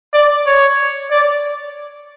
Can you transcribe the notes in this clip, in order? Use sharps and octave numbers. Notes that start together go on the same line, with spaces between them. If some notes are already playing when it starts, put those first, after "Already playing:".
D5
C#5
D5